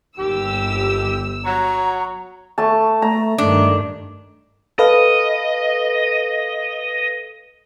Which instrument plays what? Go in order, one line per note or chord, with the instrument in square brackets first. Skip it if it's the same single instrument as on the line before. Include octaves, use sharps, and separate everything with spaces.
[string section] G1 E6 [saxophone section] D#2 G4
[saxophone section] F#3 C#5 [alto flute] A#5
[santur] A3 A5
[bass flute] A3 [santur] A#5
[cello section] G2 D#3 [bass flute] A3 [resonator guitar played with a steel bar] D4
[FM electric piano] A4 B4 F5 [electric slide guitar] D#5